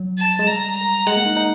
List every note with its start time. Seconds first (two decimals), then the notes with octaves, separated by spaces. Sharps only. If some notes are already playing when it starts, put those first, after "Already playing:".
Already playing: F#3
0.19 A5
0.39 G#3
0.47 G3 A#5
0.76 A#5
1.07 G#3 F#5
1.16 A#3
1.26 D#4
1.36 D#4